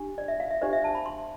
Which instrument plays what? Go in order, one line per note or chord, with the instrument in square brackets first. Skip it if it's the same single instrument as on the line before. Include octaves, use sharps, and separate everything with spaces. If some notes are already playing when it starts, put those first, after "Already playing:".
Already playing: [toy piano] D4 G4
D5
E5
F5
E5
D4 G4 C5 D5
E5
A5
B5
C6